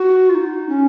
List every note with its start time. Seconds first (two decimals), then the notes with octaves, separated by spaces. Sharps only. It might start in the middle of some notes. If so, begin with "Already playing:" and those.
Already playing: F#4
0.29 F4
0.35 D#4
0.69 C#4